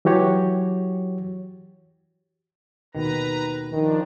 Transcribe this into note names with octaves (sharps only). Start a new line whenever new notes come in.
E3 F#3 F#4 G4 C#5
D#2 B2 D#3 B4 A#5
D#3 F3 D4